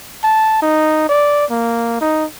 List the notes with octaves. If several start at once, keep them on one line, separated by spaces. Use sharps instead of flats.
A5
D#4
D5
A#3
D#4